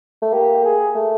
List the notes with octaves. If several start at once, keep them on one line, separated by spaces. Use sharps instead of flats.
A3
A#3 G4
G#4
A3